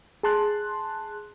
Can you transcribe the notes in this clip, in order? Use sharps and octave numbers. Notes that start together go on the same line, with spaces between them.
G#4 A5 C6 F#6